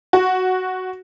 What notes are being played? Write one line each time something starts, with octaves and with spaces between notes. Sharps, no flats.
F#4